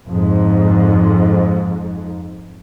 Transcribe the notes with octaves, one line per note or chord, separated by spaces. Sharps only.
F2 G#2